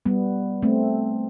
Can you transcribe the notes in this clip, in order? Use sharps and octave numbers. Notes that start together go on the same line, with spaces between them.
G3 B3
A3 C4